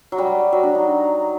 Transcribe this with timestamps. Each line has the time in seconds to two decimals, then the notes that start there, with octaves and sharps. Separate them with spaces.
0.12 F#3
0.18 G3
0.53 F#3
0.63 D4
0.75 D#4